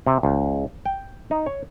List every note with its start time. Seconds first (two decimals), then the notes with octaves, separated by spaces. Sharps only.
0.07 C3
0.23 C#2
0.86 G5
1.31 D#4
1.46 C#5